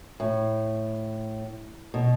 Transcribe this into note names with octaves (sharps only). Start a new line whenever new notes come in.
A2
B2